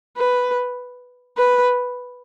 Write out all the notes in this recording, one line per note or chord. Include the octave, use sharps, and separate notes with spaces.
B4
B4